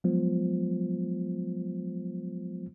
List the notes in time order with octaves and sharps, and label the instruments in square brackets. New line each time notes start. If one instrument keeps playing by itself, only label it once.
[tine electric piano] F3 F#3 G#3 B3 F4 C5